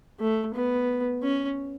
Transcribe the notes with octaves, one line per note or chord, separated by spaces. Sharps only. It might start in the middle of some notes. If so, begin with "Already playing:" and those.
A3
B3
C#4